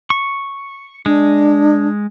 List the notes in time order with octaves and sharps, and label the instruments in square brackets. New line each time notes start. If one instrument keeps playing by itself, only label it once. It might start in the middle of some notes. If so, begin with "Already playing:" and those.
[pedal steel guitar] C#6
[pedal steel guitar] G#3 [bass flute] D4